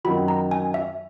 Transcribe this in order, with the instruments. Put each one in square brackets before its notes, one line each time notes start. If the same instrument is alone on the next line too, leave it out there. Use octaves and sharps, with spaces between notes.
[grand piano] F#2 D#3 F#3 [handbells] B5
[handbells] A#5
G#5
E5